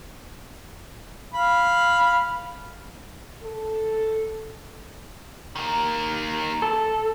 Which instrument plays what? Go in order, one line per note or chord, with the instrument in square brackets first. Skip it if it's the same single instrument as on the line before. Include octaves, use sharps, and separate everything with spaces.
[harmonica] F5 B5
[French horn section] A4
[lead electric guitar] D#3 A#3
[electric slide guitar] A4